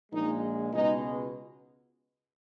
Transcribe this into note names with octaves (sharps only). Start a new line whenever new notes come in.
A#1 A#2 G#3 D#4
C#2 B2 G#3 D#4